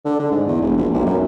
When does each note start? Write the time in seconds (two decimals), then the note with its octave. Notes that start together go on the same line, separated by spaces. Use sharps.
0.05 D3
0.19 D3
0.31 G#2
0.47 E2
0.62 E1
0.78 A#1
0.94 B1
1.06 F#2